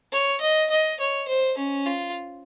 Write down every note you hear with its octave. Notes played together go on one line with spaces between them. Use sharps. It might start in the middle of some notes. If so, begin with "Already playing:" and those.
C#5
D#5
D#5
C#5
C5
C#4
F4